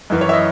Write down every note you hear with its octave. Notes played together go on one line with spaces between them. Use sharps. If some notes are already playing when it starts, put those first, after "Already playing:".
F#2 E3
C#5
E5
D#5